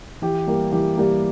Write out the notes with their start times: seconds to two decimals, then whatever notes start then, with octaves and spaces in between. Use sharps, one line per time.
0.22 E3 G4
0.47 G3 A#3
0.72 E3 G4
0.97 G3 A#3